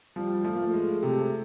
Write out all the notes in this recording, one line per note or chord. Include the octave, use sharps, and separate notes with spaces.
F3 G3
F3 A3
A#3
A3
G#3
C3 A3